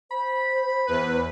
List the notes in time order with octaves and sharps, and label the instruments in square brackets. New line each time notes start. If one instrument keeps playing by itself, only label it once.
[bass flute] C5 [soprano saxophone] B5
[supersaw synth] E2 B4